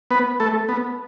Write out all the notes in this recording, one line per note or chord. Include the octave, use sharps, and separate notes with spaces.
B3 B4
A3 A4
B3